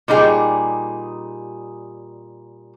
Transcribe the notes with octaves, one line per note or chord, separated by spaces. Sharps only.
A#2 G3 D#4 G#4 G5